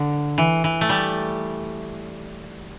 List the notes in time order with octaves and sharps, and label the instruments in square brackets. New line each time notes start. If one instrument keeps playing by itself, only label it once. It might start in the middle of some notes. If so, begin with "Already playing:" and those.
Already playing: [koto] D3
E3
E3
A3
G3